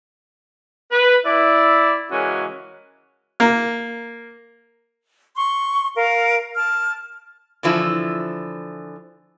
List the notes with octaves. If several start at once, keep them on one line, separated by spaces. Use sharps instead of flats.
B4
E4 D5
C#3 E3 G#3 C#4 F#4 A#4
A#3
C6 C#6
A#4 F5
A5 F6
D3 E3 F3 E4